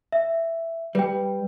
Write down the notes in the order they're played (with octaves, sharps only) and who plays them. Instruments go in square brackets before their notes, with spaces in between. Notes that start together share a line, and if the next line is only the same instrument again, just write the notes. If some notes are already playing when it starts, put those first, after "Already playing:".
[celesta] E5
[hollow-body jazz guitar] G3 [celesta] B4 G5